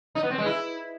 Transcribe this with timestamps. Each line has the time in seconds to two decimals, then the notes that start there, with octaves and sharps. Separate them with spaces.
0.15 D#4
0.23 B3
0.31 C4
0.38 G#3
0.46 E4